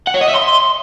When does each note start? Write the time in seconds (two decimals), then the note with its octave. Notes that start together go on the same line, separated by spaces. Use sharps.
0.07 F#5
0.14 C#5
0.21 D#5
0.28 E5
0.35 C6